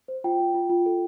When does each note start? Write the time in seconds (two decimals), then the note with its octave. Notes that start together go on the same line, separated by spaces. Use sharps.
0.08 C5
0.24 F4 G5
0.40 F4
0.54 F4
0.70 F4
0.86 A4